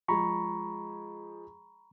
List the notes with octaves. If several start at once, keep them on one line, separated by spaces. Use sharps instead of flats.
F3 G#3 G#4 A#5 B5 C#6